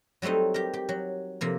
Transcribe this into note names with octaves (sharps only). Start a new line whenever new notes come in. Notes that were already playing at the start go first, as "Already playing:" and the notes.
F#3 G3 A3 C4 D#4
G4 A#4
G4
F#3
C3 F3 A#3